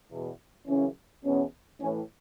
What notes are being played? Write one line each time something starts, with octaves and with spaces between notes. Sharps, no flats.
E2 B2
F#2 C#3 E3 C#4
E2 B2 C#4
A2 E3 C#4